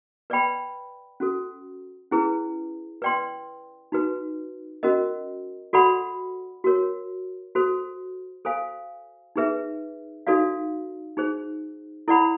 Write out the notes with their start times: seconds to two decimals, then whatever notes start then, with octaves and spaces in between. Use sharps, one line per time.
0.30 B4 D5 G5 B5
1.20 C#4 F#4 A4
2.11 C#4 E4 G#4 B4
3.02 B4 D5 G5 C6
3.92 D#4 F#4 B4
4.83 C#4 F#4 A#4 D#5
5.73 F#4 A4 D5 F#5 B5
6.64 F#4 A#4 C#5
7.55 F#4 A4 C5
8.45 A4 C5 F5 G#5
9.36 D#4 G#4 B4 E5
10.27 D#4 F#4 A4 D5 F5
11.17 D#4 G#4 C5
12.08 E4 A4 D5 F#5 B5